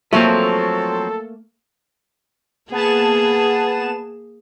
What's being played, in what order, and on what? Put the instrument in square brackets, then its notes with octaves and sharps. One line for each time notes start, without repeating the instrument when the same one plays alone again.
[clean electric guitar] F3 F#3 C4 [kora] A3 [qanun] A#3 A#4 G#5 [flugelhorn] A4
[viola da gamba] A#3 G#4 [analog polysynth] B3 A5 E7